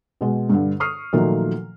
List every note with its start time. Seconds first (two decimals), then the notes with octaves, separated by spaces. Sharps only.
0.21 B2 G#3
0.49 G2 D3
0.80 C#6 D#6 F6 C7
1.13 A#2 D#3 F3 F#3 A3 A#3